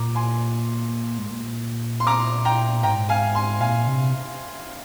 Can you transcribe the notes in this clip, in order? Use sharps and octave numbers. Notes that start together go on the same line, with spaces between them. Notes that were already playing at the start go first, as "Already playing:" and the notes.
Already playing: A#2 A#5 D6
G#5 C6
G#2
A#2
C6
A#5 D6
G5 A#5
G#2 G5 A#5
F5 G#5
G#5 C6
A#2 F5 G#5
C3